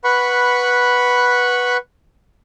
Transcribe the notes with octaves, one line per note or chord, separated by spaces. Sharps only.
B4 F#5 B5 C#6